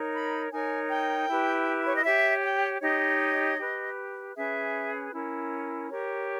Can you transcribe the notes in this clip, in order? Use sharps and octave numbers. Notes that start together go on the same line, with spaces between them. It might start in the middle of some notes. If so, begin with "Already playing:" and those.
Already playing: D#4 A#4 C#5
B5
D#4 A#4 C#5 G#5
G5
E4 G4 B4
C#5
D#5
G4 C#5 E5
G5
D#4 G4 C#5 D#5
G4 B4
C#4 G#4 B4 E5
C#4 E4 A#4
G4 A#4 C#5